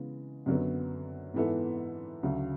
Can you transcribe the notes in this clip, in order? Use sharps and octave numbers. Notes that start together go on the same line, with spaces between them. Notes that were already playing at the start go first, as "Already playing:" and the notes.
Already playing: C#3 E3 G#3 B3
F#2 D3 F#3 B3
G#2 E3 B3 E4 A4
D2 C#3 F#3